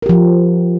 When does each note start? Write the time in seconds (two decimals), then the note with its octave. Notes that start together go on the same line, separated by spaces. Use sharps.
0.02 A#4
0.06 G4
0.09 F3